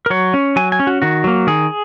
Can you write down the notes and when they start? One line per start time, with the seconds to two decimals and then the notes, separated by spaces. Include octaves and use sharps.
0.06 A#4
0.10 F#3 C#5
0.34 C#4
0.56 F#3 G#5
0.72 G#5
0.80 C#4
0.87 F#4
1.02 D#3 F#4
1.24 F#3 A#3
1.47 D#3 G#4